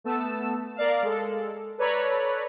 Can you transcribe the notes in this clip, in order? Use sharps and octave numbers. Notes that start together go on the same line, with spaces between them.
A3 B3 A5 E6 E7
A#4 D5 F5
G#3 A4
A4 B4 C#5 D5 A#5 B5